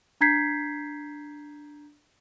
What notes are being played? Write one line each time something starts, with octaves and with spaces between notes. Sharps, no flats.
D4 A#5 G6 G#6 B6 C7